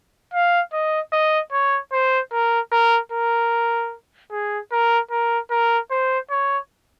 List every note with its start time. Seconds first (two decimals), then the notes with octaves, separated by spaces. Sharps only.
0.34 F5
0.73 D#5
1.13 D#5
1.52 C#5
1.92 C5
2.32 A#4
2.72 A#4
3.12 A#4
4.32 G#4
4.72 A#4
5.11 A#4
5.51 A#4
5.91 C5
6.31 C#5